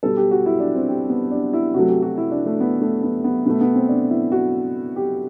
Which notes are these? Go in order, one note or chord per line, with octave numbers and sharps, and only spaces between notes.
B2 G3 A4
G4
F#4
E4
D4
C4
G4
B3
D4
E4
C3 F#3 A3 F#4
G4
F#4
E4
D4
A3
B3
A3
B3
B3
B2 A3 B3
B3
C4
D4
E4
F#4
G4